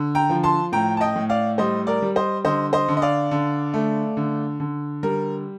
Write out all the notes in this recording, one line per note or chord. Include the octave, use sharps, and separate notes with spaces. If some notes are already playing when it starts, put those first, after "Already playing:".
Already playing: D3
G5 A#5
F3
A5 C6
A2 G5 A#5
A5
D#5 G5
A2
D5 F5
G3 C5 D#5
A#4 D5
G3
C5 D#5
D3 C5 D#5
C5 D#5
D3
D#5
D5 F5
D3
A3
D3
D3
G3 A#4